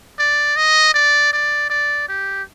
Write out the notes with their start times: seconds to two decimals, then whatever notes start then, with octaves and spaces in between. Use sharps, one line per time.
0.19 D5
0.57 D#5
0.94 D5
1.33 D5
1.70 D5
2.08 G4